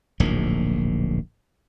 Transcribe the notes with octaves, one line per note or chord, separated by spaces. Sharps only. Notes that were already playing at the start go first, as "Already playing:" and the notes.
D1 A#1 G#2 A#3